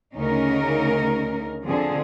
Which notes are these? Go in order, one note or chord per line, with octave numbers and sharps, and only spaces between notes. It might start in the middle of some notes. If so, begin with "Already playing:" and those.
D2 C#3 C#4 D#4 A#4
D3 F3 C4 G#4